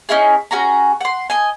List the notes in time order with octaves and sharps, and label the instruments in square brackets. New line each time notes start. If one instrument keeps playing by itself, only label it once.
[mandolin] C#4 D#4 E4 G#4
C#4 F#4 G#4 A#5
F#5 C6
D#5 G#5